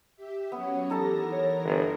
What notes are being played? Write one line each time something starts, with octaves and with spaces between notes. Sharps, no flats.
G4 E5
F#3 B3 C#4 C#5
E3 D#4 G4 A4 A#4 A5 A#6
C#5
G1